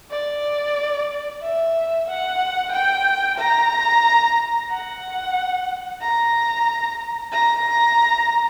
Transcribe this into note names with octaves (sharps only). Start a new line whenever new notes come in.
D5
E5
F#5
G5
A#5
F#5
A#5
A#5